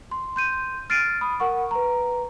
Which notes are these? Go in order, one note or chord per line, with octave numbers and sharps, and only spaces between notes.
C6
C6 G6 D#7
F6 A6 C7 D7 D#7
B5 D#6
A#4 F#5 C#6
B4 A#5